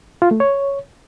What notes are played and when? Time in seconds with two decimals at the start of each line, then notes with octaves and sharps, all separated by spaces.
0.22 F4
0.31 A3
0.40 C#5